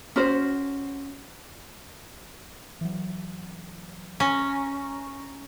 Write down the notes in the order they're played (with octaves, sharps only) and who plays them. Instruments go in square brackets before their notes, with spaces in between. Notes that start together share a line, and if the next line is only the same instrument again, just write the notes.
[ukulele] C#4 F#4 C5
[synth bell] E3 F#3
[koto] C#4 [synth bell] A#5 A#6